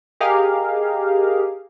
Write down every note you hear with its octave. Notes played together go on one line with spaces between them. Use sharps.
G4 G#4 A#4 D#5 F5